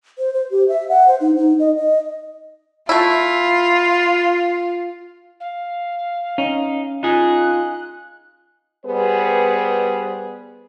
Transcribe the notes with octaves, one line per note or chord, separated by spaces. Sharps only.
C5
C5
G4
E5
F#5
C5
D#4
D#4
D#5
D#5
A3 E4 F4
F5
C#4 D#4
D#4 F4 G#4 F#6
G3 B3 G#4 B4 C5